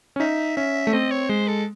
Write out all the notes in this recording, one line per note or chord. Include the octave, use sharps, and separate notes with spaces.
C#4
D#4 E5
C#4 E5
A3
C4 D#5
C#5
G#3 C5
A4